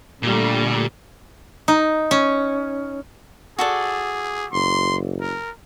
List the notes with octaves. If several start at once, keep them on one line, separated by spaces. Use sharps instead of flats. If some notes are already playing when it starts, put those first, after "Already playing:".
A#2 D3 G3 A3
D#4
C#4
F#4 G#4 A4 D5
F#1 C6
A#4